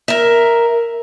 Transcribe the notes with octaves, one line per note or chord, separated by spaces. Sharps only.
A#4 E5